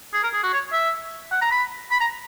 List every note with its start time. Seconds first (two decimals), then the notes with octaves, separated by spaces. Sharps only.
0.13 G#4
0.23 A#4
0.33 G#4
0.43 F#4
0.53 C#5
0.72 E5
1.32 F#5
1.42 A#5
1.51 B5
1.91 B5
2.00 A#5